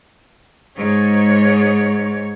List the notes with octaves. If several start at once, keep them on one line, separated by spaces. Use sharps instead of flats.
G#2 C#5